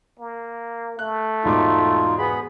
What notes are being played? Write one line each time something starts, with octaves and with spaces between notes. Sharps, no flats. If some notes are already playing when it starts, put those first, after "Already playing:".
A#3
A3 F#6
E1 G#2 D#4 F4 D6
B3 G#4 B5